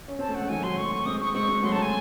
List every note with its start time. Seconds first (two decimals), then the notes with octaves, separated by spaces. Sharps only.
0.08 C#4
0.19 C4 A5
0.29 A3
0.35 G#3 F#5
0.49 D#3 F#3 G#5
0.63 F#3 A3 C6
0.78 C#6
1.05 G#3 C4 D#6
1.20 C#6
1.34 G#3 C4 C#6
1.48 G#3 C4
1.62 F#3 A3 C6
1.72 A5
1.82 G#5